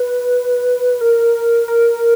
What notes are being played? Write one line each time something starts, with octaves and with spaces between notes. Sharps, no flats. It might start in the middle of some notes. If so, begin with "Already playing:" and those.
Already playing: B4
A#4
A#4